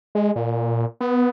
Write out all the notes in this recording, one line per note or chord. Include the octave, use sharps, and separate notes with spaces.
G#3
A#2
B3